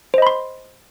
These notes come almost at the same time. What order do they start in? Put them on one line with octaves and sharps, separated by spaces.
C5 D#5 B5 C6